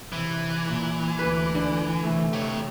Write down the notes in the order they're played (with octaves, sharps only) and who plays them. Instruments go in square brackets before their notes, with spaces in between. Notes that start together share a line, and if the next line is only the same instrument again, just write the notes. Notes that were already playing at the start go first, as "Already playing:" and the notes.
[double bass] C3 [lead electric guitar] E3
[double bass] A#2
[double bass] D2 [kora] B4
[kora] D3
[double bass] C3 A3
[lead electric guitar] G4 C#5